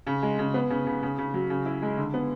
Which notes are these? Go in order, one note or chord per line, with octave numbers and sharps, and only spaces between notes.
C#3
G#3
C#3
B3
C#3
C#3
C#3
C#3
F#3
C#3
E4
G#3
D3
B3